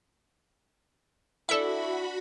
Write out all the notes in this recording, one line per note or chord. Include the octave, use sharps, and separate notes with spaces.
D4 E4 F#4 A4 D5 E5 G#5 B5